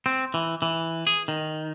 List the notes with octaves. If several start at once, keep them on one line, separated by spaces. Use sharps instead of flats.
C4
E3
E3
G#4
D#3